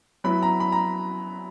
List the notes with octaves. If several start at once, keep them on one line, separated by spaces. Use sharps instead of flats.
F#3 B3 E4 B5
A#5
B5
A#5